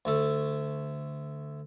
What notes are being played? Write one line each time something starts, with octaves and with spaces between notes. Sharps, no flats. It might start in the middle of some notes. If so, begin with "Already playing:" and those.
D2 A3 A4